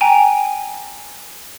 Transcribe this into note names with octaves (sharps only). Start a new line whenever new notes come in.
G5 G#5 A#5